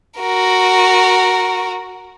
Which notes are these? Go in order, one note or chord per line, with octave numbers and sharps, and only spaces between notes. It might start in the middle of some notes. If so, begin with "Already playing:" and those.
F#4 A#4